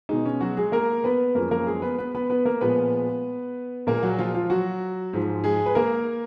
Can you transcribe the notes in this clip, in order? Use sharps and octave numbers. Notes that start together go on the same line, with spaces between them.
B2 G#3 D#4
C#4
F#3 F#4
G#3 G#4
A#3 A#4
B3 B4
F#2 F3 G#3 A#3 A#4
A#3 A#4
G#3 G#4
B3 B4
B3 B4
B3 B4
B3 B4
A#3 A#4
A#2 F3 G#3 B3 B4
A#2 G#3 A#3 A#4
F#3 F#4
F3 F4
F3 F4
F#3 F#4
G#2 F3 G#3
G#3 G#4
B4
A#3 A#4